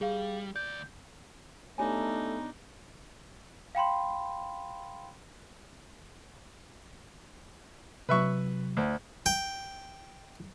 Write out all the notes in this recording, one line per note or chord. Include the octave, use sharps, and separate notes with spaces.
G3 G#4 F5
D2 D5 G6
A3 B3 D4 D#4 G4 C#5 G#5 A#5
F5 G5 B5 C6
C3 F#3 B4 E5 C#6
D2
G5